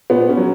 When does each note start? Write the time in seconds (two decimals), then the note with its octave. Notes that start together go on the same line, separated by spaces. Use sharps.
0.10 A#2 B3
0.28 C#4
0.37 F#3